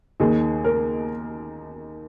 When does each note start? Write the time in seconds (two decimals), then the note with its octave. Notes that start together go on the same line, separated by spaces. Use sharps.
0.20 D#2 D#3 G#4
0.64 A#4